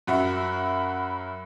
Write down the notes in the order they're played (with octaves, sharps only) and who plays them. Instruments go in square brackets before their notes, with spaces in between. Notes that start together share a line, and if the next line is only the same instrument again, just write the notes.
[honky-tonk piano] F#2 F#4 E5 [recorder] B5